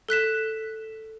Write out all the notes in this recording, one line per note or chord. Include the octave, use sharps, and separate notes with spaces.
A4 F#6 B6 E7